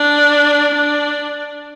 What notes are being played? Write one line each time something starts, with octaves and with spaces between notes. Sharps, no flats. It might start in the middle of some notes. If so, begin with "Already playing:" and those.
Already playing: D4
D4